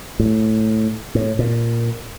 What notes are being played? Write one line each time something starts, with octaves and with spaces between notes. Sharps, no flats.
A2
A2
A#2